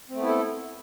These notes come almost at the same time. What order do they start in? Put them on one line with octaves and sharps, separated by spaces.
C4 A3 B3 E4 A4